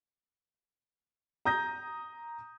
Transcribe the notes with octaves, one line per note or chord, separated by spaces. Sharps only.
A#5 D#6 G6 A#6